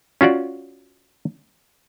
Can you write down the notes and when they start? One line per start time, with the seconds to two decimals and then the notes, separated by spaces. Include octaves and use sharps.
0.21 C#4 F4 F#4 D5